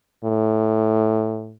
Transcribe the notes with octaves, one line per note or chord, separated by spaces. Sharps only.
A2